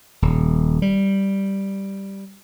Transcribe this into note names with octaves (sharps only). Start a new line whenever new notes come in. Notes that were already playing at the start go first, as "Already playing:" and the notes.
D#1
G3